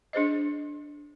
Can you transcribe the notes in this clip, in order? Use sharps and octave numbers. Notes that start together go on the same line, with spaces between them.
D4 G#4 C5 D#5